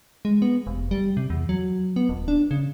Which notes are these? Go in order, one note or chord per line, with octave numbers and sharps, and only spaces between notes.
G#3
B3
F1
G3
C3
E2
F#3
B3
D#1
D4
C#3